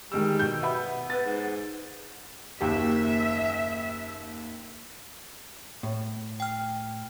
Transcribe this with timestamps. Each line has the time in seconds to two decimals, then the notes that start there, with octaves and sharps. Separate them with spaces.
0.12 D#3 G3 G#3 E6
0.39 B2 G6
0.63 B3 E5 B5
1.10 B3 B4 A6
1.26 G#2
2.61 F#1 D#2 G4 E5
5.83 A2
6.40 G5 F6